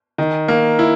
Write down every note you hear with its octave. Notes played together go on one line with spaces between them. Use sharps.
D#3
A#3
E4